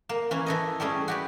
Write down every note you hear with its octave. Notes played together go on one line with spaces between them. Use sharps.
A#3
E3 A#3 C#4
E3 A4 D#5
G3 A3 C#4 G#4
F#4 G4 B4